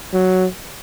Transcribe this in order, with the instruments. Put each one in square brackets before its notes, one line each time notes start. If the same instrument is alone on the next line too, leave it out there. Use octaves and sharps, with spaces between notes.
[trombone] F#3